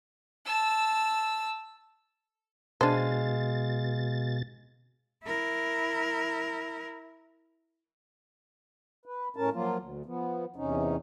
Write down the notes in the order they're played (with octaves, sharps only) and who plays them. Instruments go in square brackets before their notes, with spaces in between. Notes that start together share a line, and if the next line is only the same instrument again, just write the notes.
[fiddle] A5 E6
[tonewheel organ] B2 A6 [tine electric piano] G#3 F5 G#5 [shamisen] D4 C5
[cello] E4 A#4
[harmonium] B4
A2 C#4 A#4 A5
F3 F#3 A#3 F4
D2
F3 B3
E2 C3 C#4 D#4